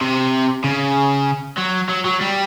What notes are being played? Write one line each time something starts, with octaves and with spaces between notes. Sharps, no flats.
C3
C#3
F#3
F#3
F#3
G3